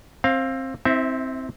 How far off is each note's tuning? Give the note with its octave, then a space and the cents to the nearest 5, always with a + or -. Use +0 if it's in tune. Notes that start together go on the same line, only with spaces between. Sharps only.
C4 +20 F5 +0
C4 +0 E4 -35 E5 +0